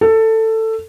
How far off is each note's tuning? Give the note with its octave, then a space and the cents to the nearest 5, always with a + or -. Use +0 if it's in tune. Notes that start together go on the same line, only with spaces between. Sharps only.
A4 +15